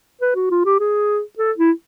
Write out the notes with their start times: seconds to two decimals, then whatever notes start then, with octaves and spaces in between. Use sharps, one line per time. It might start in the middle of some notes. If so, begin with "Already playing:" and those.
0.22 B4
0.36 F#4
0.51 F4
0.65 G4
0.80 G#4
1.39 A4
1.58 E4